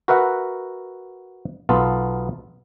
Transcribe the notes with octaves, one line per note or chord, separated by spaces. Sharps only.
F#4 A#4 B4 E5 F#5
B1 B3 F4 A4